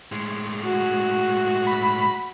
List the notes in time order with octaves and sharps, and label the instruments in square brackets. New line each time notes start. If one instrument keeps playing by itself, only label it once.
[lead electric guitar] A2 G#3
[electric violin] F#4
[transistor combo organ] B5